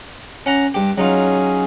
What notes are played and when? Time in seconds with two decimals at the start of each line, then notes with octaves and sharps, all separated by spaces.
0.46 C#4 F#5 A#5
0.74 G2 G4
0.98 F#3 C#4 D#4 F4 G#4